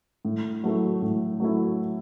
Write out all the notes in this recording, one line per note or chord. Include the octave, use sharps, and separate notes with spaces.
A2
F#3 A3 E4
A2
F#3 A3 E4